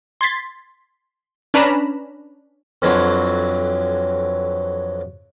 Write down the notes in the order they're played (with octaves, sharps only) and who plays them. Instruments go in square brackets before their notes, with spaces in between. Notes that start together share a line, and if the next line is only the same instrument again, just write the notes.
[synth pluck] C6 G#6 A6 B6
C#4 D4 B4 A#5 B5 E7
[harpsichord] F2 D3 E3 F#3